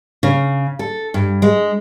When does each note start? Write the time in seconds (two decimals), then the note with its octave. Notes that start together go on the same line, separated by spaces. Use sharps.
0.23 C#3
0.79 A4
1.14 G2
1.42 G#3